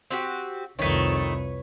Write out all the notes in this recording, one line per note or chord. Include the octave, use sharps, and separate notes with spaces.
C4 F#4 G4
C2 F2 D#3 A3 B4 C#5